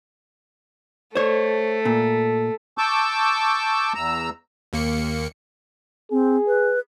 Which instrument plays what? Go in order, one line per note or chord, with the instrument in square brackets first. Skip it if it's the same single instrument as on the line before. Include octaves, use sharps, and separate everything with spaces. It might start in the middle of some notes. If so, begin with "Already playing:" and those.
[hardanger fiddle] A3 [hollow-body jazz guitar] C5 C#5
[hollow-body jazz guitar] A#2
[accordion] A5 C#6 D6 E6 G6
E2 A#5 E6
[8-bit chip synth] D#2 A#3 C#7
[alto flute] C4 [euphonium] G#4
[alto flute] B4